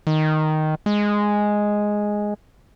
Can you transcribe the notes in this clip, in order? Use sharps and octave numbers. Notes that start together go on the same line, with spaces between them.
D#3
G#3